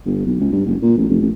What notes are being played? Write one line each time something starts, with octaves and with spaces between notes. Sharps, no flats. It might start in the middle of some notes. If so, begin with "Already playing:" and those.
G1
B1
C#2
G2
F#1
A#2
A1
F1
A1